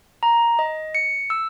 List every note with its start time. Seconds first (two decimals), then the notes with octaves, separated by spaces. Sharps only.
0.23 A#5
0.59 D#5
0.95 C#7
1.30 E6